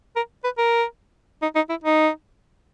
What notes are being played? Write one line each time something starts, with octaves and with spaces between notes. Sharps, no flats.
A#4
B4
A#4
D#4
D#4
E4
D#4